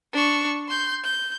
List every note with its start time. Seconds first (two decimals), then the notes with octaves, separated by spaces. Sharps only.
0.13 D4 C#6
0.69 C6 G6
1.04 G6